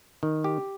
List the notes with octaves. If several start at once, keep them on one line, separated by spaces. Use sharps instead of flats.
D#3
G4